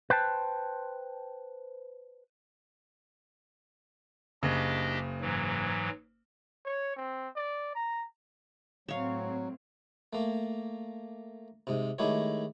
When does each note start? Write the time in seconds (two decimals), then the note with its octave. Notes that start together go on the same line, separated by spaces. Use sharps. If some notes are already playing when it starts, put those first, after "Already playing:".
0.10 B4 C5 G5 A5
4.43 F#1 C#3 D4 G4 D#5
5.21 G#2 E3 F#3
6.65 C#5
6.96 C4
7.36 D5
7.75 A#5
8.88 A2 F#3 C4 C#5 F5
10.13 A3 A#3
11.67 G#2 C3
11.98 D#3 G#3 A3 E4 G4 C#5